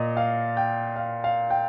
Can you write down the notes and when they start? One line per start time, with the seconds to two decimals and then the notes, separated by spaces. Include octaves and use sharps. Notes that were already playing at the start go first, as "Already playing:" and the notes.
Already playing: A#2 D#5
0.17 F5
0.57 G5
0.96 F5
1.24 F5
1.50 G5